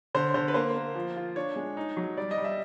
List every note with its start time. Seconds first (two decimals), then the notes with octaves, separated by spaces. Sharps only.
0.15 D3 C5
0.34 D3 C5
0.48 B4
0.54 A#3 C5
0.76 A#3
0.95 F3
1.16 F4
1.36 D4 C#5
1.56 G#3
1.77 D#4
1.97 F#3
2.17 G3 D5
2.31 D#5
2.38 G3
2.44 E5